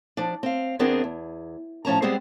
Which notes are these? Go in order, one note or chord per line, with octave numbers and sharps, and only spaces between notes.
F3 D4
C4 F5
E2 B3 C4 D4 G#4 A#4
E2
A2 F3 C#4 A5 A#5
G3 G#3 B3 C4 G#4 C5